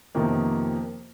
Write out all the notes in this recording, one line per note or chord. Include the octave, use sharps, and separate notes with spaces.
F2 C3 D#3 F3 A#3 B3